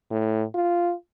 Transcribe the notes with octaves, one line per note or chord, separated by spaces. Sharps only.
A2
F4